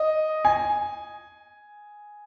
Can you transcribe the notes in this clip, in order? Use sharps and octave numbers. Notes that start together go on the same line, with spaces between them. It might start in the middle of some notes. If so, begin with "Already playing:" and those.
Already playing: D#5
G#5